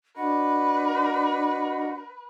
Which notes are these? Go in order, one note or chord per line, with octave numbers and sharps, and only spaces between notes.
D4 F#4 B4 D#5 F#5